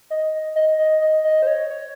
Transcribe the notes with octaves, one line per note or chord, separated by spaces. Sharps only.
D#5
D#5
D#5
D#5
D#5
C5
C#5
C#5